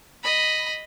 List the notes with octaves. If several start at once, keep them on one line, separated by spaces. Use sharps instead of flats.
D#5 B5